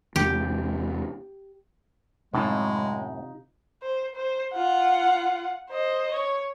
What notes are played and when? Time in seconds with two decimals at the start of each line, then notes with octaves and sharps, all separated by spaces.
0.16 E2 C3 G#3 G4
2.34 F#2 A2 C3 G#3 D#4 F4
3.83 C5
4.16 C5
4.54 F4 F#5
5.70 C5 D#5
6.13 C#5